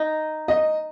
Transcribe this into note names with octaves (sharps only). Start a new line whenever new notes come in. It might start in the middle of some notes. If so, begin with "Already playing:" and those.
Already playing: D#4
D#5